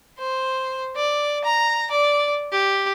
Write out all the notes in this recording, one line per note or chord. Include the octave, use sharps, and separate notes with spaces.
C5
D5
A#5
D5
G4